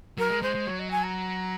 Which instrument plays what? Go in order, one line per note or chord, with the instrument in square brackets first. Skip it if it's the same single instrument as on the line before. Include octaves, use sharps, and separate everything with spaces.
[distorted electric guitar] F#3 [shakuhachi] A#4
[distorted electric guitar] G#3
[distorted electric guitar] G#3 [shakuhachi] C5
[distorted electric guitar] G#3
[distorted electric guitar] F#3 [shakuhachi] C#5
[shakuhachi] D#5
G#5
A#5